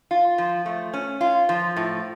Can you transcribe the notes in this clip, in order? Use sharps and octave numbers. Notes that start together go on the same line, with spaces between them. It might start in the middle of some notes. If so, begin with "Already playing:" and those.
F4
F3
A3
C#4
F4
F3
A2